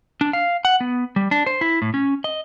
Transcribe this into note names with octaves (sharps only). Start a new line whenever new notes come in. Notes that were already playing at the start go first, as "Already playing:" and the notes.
D4
F5
F#5
B3
G3
D4
C5
E4
A2
C#4
D#5